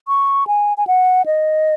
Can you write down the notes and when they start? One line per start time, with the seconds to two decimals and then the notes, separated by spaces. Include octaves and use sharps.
0.08 C#6
0.47 G#5
0.77 G#5
0.87 F#5
1.26 D#5